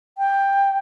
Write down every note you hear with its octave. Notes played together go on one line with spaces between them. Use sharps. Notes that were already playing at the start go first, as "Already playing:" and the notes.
G5